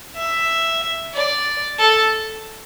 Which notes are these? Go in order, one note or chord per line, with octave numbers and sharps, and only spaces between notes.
E5
D5
A4